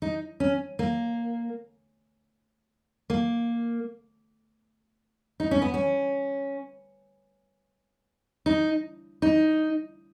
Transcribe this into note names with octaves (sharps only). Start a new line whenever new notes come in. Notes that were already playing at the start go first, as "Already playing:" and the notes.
D#4
C#4
A#3
A#3
D#4
C#4
B3
C#4
D#4
D#4